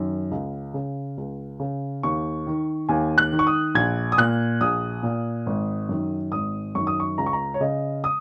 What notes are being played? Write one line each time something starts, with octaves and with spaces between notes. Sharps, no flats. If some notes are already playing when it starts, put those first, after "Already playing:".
Already playing: F#2 D#3
C#2
C#3
C#2
C#3
D#2 C#6
D#3
D#2 G#5
F#6
D#3
C#6
D#6
A#1 G#6
D#6
A#2 F#6
A#1 D#6
A#2
G#1
F#2 D#3
G#1 D#6
F#2 D#3 C#6
D#6
C#6
C#2 A#5
C#6
A#5
C#5
C#3 D#5
D#6